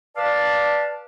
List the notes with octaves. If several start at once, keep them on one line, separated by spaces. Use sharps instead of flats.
B4 D5 F5 A5